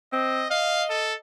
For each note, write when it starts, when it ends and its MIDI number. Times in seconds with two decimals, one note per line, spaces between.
0.13 0.46 60
0.13 0.46 75
0.51 1.19 75
0.51 0.85 77
0.90 1.14 69